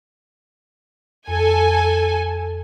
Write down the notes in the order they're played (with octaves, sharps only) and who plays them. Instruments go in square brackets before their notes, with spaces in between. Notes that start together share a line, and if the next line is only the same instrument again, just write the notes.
[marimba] F2 [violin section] A4 G#5